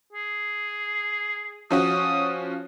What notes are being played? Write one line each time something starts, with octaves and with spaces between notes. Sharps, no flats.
G#4
F3 C#4 F#4 D#6